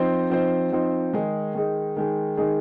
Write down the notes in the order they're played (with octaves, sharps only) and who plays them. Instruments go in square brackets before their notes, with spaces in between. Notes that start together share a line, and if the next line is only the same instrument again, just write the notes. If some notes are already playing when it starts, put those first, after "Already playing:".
Already playing: [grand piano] F3 C4 D#4 C5
F3 C4 D#4 C5
F3 C4 D#4 C5
D#3 G#3 D#4 G#4
D#3 G#3 D#4 G#4
D#3 G#3 D#4 G#4
D#3 G#3 D#4 G#4